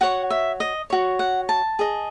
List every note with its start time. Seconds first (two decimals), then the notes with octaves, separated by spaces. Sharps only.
0.01 F#4 C#5 F#5
0.30 E5
0.60 D#5
0.90 F#4 C#5
1.19 F#5
1.49 A5
1.79 G#4 D#5